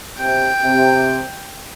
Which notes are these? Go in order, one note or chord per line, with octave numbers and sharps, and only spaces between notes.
C3 G5
C3